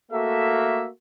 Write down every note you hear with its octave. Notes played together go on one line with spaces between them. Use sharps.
A3 A#3 F#4 A4 E5